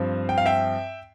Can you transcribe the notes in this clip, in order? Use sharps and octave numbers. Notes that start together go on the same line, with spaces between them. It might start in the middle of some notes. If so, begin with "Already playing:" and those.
Already playing: G2 F3 C4
G5
F5
E5 G5